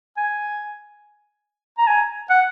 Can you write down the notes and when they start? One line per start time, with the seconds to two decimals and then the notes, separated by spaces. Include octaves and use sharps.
0.18 G#5
1.78 A#5
1.87 G#5
2.30 F#5